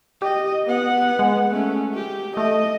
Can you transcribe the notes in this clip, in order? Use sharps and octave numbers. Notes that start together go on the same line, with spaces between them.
G4 D#5
B3 F#5
G#3
A3 C#4
G4
A3 D#5